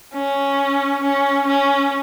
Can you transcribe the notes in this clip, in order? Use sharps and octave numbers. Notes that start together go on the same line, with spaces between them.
C#4
C#4
C#4